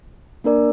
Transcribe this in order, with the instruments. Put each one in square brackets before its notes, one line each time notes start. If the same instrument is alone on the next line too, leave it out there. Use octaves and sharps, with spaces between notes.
[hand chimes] A#3 D4 A#4 D5